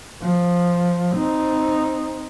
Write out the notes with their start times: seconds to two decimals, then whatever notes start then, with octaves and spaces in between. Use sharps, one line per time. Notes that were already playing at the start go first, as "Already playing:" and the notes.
0.21 F3
1.16 C4 D#4